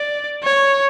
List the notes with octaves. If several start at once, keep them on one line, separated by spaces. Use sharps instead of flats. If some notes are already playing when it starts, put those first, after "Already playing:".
Already playing: D5
C#5